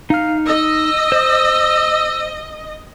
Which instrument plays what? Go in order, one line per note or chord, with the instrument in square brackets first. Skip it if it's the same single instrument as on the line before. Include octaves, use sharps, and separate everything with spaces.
[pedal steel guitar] D#4 F6 [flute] F5
[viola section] D#5 [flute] E6
[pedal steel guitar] C5